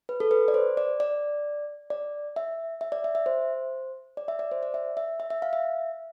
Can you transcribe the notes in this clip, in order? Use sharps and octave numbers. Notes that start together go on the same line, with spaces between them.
B4
A4
B4
D5
C5
D5
D5
D5
E5
E5
D5
E5
E5
C5
D5
E5
D5
C5
D5
E5
E5
E5
E5
F5
E5